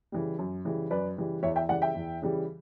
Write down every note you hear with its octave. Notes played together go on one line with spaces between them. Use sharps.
C#3 E3 G3
F#2
C#3 E3 G3
F#2 B4 D5
C#3 E3 G3
E2 C#5 E5
E5 G5
C#3 E3 G3 D5 F#5
E5 G5
E2
C#3 E3 G3